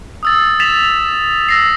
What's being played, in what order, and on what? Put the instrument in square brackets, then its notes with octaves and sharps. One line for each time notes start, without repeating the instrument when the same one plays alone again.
[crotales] D#6 E6 A6
A6 B6 E7 F7
E6 A#6 C7